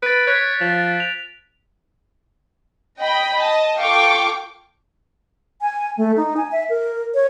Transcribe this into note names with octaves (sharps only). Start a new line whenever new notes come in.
B4 A6 D7
C#5 F#6 B6
F3
F7
D#5 G5 B5
D#5 A5
F4 A4 F5 G5 C#6 D6
G#5
A3
D#4
G#5
E5
A#4
C#5